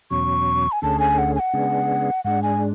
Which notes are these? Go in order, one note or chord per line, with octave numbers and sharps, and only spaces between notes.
E2 B2 F#3 C#4 C#6
G#5
D2 D3 A3 C#4 G#4 A5
G#5
F#5
G#5
F#5
C#3 G#3 B3 D4 G#4
G#2 G#3 D4 F#5
G#5